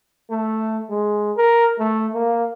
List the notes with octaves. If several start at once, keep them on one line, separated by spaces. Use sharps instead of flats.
A3
G#3
A#4
A3
A#3